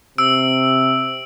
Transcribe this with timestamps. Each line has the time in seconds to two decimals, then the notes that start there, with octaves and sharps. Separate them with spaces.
0.18 C3 E6 D7